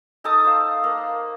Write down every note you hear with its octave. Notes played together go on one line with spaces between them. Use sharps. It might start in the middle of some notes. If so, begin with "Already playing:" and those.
D#4 A4 A5 D#6
C5 F5
A#3